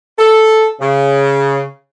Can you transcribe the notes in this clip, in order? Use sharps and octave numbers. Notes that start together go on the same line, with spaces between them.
A4
C#3